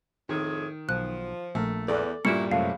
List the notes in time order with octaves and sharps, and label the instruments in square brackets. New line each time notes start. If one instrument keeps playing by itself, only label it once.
[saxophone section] F2 A2 G#4 [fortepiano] D#3
[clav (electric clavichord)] B1 [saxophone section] F3 [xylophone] F#6
[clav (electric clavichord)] A#1 A#4 [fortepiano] A3
[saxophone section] E2 [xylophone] A4 [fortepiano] D5
[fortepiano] G2 A#2 G3 [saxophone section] C#4 E4 F#4 [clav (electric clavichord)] A#4 [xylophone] C#7
[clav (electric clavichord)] F#2 C3 A3 [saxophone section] F3 F#3 [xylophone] F5